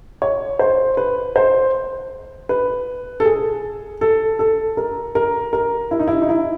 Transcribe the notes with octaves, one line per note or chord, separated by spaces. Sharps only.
C#5
C5
B4
C5
B4
A4
G#4
A4
A4
A#4
A#4
A#4
E4
D#4
E4
D#4
E4